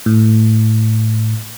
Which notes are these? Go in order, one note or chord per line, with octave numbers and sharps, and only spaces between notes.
A2